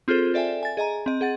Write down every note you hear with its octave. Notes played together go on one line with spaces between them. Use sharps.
C4 F4 G#4 A4 C5
A4 D5 E5 G5 G#5
G#5 A6
G#4 D#5 G#5 A#5
C4 D#5
G#4 F#5 A6